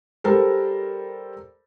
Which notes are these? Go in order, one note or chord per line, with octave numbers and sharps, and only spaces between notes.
G3 A4 A#4 C5